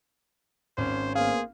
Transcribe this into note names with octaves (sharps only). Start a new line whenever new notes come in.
G#1 C#4 C5
A#3 B3 G#4 C5 F5